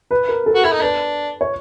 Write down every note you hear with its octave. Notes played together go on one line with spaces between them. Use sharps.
B4
A#4
A4
F#4
E4 A4
D#4
D4 B4
C#5